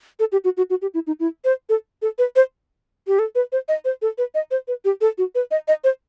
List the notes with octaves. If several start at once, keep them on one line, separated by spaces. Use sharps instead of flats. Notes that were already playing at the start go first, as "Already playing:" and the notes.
A4
G4
F#4
F#4
F#4
G4
E4
D#4
E4
C5
A4
A4
B4
C5
G4
A4
B4
C5
D#5
C5
A4
B4
D#5
C5
B4
G4
A4
F#4
B4
D#5
D#5
C5